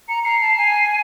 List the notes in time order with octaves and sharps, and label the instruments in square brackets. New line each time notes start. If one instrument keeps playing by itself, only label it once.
[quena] A#5 [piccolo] C#7
[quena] A#5 [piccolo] C7
[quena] A5
G#5